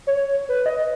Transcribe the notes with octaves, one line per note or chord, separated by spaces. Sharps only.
C#5
B4
D#5